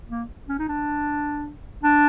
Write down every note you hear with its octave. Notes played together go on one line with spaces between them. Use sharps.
A#3
C#4
D#4
D4
D4